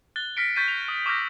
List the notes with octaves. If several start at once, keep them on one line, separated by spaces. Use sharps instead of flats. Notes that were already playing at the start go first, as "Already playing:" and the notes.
F#6 A6 G7
F6 A#6 B6 C#7 D7
C#6 G6 A6 B6 C#7 D#7
F7
D#6
C#6 D6 E6 F6 G6 A#6